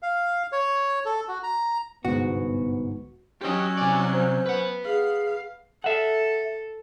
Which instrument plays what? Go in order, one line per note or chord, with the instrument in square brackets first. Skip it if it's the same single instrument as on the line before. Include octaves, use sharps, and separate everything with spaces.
[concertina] F5
C#5
A4
F#4
A#5
[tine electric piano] G1 C2 G#2 [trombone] B3 [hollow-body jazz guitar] F#4
[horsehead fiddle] F#3 C#4 [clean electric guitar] G4 D#5
[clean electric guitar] C3 D5 [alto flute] G#5
[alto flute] C5
[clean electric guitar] B4 F#5
[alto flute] G#4 [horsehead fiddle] F5
[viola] A4 [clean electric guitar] E5 F#5